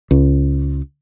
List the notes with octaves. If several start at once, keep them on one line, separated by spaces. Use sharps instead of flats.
C#2